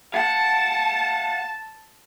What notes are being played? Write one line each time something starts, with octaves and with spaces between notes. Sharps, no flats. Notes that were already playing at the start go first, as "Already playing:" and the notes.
F5 F#5 A5